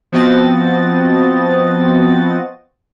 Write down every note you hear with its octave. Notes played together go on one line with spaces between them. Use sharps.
F3 B3 C4 F#4 D#5 A6